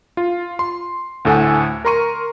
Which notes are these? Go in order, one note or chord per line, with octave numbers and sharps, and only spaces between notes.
F4
C6
D2 A2 A4 F#5 G#5
A#4 A#5 C6 C#6 D#7